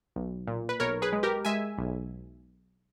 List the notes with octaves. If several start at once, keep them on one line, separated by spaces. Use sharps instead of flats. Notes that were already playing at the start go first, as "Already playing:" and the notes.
B1
A#2
B4
B1 A#4 C#5
G#4 B4
G#3
G4 A#4
G#3 E5 G#5
B1